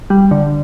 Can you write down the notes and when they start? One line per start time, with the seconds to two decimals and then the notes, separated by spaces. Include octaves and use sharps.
0.10 G3
0.31 D3